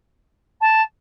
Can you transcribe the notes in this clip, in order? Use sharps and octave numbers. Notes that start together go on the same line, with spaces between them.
A5